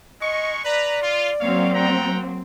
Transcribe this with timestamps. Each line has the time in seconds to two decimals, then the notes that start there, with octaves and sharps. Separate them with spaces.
0.21 G#3 D#4 D#5 C#6
0.65 B4 D5 A#5
1.02 F4
1.41 F#3 A#3 C4 C#5 F5
1.74 F#5 G5 A#5